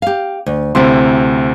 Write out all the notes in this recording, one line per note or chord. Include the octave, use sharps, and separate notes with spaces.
G4 F5
D2
D2 C3 C4 E4 C6